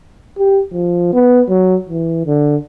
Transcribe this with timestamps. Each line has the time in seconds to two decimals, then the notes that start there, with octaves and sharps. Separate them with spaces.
0.38 G4
0.73 F3
1.13 B3
1.49 F#3
1.90 E3
2.26 D3